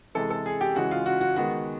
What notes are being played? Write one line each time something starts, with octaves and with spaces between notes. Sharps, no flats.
C3 E3 G#3 A4
A4
G#4
G4
C#3 E3 G#3 F#4
F4
F#4
F#4
D#3 G#3 B3 F#4